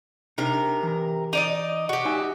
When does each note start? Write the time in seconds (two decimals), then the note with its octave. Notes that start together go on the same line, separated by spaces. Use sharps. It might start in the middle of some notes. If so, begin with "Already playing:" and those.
0.38 C3 D4 D#4 A#4
0.83 E3 A#5
1.33 D#4 D5 D#5
1.89 F#4 G4
2.05 D#4 E5 G#5